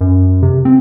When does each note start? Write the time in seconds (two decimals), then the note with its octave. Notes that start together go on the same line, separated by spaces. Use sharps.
0.01 F#2
0.42 C3
0.65 C4